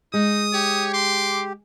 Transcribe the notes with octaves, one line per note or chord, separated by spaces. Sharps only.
G#3 D#4 D#6
G4 C#5
C6 D6